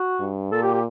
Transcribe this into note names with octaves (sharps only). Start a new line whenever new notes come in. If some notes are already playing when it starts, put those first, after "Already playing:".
Already playing: F#4
G2
A#2 A4
G4
G4